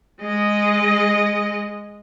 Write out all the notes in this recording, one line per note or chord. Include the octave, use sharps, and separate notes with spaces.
G#3 D#5